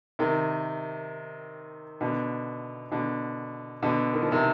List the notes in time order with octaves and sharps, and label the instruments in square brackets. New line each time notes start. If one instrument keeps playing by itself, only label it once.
[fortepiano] C3 D#3
B2 D3
B2 D3
B2 D3
D#3
F3
C3 D#3